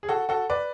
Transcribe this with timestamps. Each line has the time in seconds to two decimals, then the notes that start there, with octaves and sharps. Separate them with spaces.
0.03 G#4
0.09 F#4 A4
0.29 F#4 A4
0.50 B4 D5